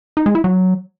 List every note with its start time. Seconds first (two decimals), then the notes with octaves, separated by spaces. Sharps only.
0.17 D#4
0.26 G#3
0.35 E4
0.44 F#3